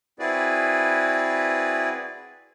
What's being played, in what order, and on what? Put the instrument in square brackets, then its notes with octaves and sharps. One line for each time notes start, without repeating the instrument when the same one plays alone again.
[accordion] C4 E4 F#4 G#4 B4 D5